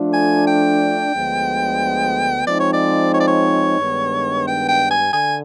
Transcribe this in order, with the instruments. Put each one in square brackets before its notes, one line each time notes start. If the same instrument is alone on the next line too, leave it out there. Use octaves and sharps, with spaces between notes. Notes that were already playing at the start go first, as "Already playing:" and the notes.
Already playing: [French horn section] F3 A3 D4 F4 A4
[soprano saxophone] G#5
G5
[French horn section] D2 D3 F3 G#3 B3
[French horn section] F3 G#3 C4 D#4 [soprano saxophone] D5
[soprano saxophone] C#5
D5
C#5
D5
C#5
[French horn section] G2 D#3 G#3 B3 D4
[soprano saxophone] G5
G5
G#5
[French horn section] D3 [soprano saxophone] G#5